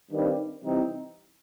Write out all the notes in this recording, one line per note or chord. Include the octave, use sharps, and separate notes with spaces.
G2 D#3 G3 C4 D#4
C3 E3 G3 C4 D#4